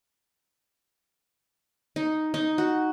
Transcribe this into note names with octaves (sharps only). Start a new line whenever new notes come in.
D#4
D#4
F#4